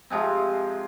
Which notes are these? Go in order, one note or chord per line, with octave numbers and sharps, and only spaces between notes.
C3 F3 G#3 C4